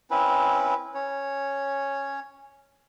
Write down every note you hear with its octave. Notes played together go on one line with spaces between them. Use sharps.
C4 C#4 E4 B4
C#4 C#5